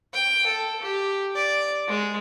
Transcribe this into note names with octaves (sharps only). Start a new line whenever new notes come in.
G5
A4
G4
D5
G#3